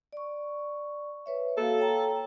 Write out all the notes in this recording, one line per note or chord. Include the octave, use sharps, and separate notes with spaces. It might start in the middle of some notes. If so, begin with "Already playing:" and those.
D5 C#6
B4 C#5 E5
A#3 F#4 A4 F5
C#5 G5 A#5